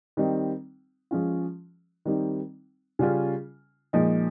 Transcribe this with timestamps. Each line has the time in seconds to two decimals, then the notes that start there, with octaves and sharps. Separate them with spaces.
0.17 D#3 G3 C4 D#4
1.11 F3 G#3 C#4 F4
2.05 D#3 G3 C4 D#4
2.99 C#3 G3 C#4 F4
3.93 A#2 F3 G#3 D#4